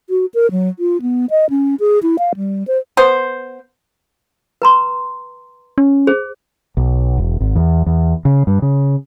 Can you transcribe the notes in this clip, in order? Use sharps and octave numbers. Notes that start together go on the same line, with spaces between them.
F#4
A#4
F#3
F4
B3
D#5
C#4
G#4
E4
F5
G3
C5
B3 C5
B4 A#5 C6
C#4
G#4 C5
B1
E1
G#1
E2
E2
C#3
G2
C#3